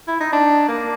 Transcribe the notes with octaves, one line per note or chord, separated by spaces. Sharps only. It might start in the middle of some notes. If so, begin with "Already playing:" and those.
E4
D#4
D4
A#3